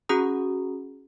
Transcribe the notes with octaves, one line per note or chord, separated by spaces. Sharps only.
C#4 F#4 G#4 A#5 D#6